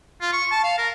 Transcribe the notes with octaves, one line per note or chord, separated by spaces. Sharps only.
F4
C#6
A5
F5
A#4